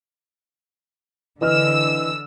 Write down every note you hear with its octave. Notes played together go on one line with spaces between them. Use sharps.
D3 E3 D#5 E6 F6